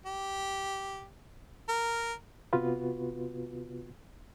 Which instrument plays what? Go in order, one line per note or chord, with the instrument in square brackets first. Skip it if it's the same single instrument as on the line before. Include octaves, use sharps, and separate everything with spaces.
[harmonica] G4
A#4
[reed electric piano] C3 B3 F4 F#4 B4